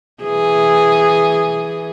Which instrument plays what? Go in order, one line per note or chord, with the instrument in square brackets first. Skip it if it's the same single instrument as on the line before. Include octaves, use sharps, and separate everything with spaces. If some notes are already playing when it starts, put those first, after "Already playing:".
[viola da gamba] E3 G#4